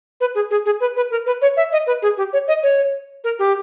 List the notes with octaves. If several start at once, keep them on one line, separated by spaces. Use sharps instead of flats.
B4
G#4
G#4
G#4
B4
B4
A#4
B4
C#5
E5
D#5
B4
G#4
G4
C#5
D#5
C#5
A#4
G4